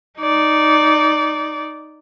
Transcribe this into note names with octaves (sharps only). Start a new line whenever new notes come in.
D#4 D5